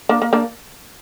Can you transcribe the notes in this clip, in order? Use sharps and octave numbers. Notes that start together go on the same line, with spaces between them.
A#3 D4
A#3
A#3 D4